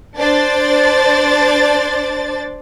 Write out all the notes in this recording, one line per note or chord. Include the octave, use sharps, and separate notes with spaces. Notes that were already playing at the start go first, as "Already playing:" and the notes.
D4 C5 D5 A6